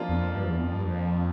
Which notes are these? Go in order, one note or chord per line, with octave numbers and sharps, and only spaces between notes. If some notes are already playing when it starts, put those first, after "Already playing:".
Already playing: F3 A#3 D4 F4
E2
F2
G2
F2
E2
F2
G2
F2